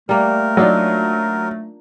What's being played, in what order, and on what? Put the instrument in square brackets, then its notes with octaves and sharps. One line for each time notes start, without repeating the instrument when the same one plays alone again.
[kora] G3 A#3 [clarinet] A3 [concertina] A#4
[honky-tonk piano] F#3 [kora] D4 D#4 F4